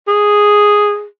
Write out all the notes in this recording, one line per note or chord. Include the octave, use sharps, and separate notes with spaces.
G#4